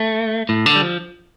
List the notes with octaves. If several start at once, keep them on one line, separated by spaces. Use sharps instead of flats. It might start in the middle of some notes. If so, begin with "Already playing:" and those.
Already playing: A3
A2
D3
G3
F3